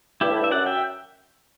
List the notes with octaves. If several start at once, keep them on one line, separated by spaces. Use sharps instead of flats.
G2 E4 G4
A2
G2
E5
F#2 D5 F#5
E5 G5